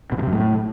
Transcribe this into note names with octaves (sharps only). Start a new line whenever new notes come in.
B2
G2
C3
F#2
A2